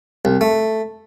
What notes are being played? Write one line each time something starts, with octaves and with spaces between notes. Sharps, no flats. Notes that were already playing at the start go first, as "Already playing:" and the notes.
C2
A3